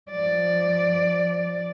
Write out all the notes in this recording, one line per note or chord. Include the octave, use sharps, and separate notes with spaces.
F3 D5